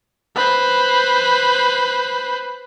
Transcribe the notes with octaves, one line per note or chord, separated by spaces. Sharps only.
B4 C5